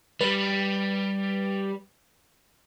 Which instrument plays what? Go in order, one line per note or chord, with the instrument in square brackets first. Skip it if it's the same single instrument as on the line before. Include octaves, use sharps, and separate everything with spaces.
[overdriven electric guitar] G3 [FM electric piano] B4